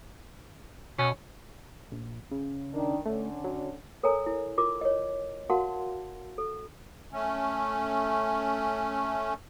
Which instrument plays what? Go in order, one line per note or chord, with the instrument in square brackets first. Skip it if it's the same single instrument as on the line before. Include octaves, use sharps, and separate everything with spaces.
[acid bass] B2 [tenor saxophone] C#4
[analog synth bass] A#1
C#3
[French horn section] D#3 D4
[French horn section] D3 C#4 D4 [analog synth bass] A3
[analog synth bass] F#3
[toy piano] A4 A#4 C#5 G#5 A#5
E4
F4 A#4 D6
C#5 D#5
F#4 A#4 F5 F#5 A5 C6
A4
[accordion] A3 C#4